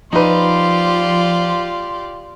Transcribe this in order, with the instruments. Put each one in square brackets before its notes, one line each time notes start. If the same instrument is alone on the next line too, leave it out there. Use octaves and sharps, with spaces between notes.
[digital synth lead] F3 [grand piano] D#4 B4 [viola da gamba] F4 G4 D5 [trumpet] C6